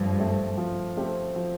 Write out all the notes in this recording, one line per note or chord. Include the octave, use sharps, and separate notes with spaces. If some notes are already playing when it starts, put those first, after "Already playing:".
Already playing: G2 F3 A3 C4
A3 C4 G4
F3
A3 C4 G4
F3